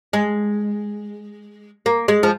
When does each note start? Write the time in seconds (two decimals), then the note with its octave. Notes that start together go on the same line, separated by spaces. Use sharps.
0.13 G#3
1.86 A#3
2.08 G#3
2.23 F3